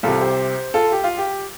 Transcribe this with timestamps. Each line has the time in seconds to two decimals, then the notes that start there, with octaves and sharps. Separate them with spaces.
0.03 C2 C3 F4 A4
0.20 G4 C5
0.74 F4 A4
0.92 G4
1.04 F4
1.18 G4